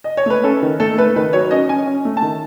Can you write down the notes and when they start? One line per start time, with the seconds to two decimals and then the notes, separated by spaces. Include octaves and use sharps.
0.04 D#5
0.17 C#5
0.26 A3 B4
0.44 C#4 A4
0.62 D#3
0.80 A3 A4
0.98 A3 B4
1.16 D#3 B4
1.33 F#3 C#5
1.51 C#4 D#5
1.69 C#4 G#5
1.87 C#4
2.05 A3
2.17 A5
2.22 D#3